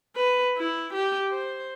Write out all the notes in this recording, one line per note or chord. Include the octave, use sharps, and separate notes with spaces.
B4
E4
G4
C5